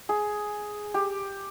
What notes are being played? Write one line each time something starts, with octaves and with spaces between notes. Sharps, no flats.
G#4
G4